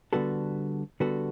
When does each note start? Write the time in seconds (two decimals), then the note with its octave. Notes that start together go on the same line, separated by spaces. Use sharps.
0.13 D3 G3 B3 F#4 A4
1.00 D3 G3 B3 F#4 A4